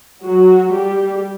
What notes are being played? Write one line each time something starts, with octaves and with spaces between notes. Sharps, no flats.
F#3 F#4
G3 G4